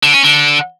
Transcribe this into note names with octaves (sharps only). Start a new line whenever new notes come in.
D3
C#4
D3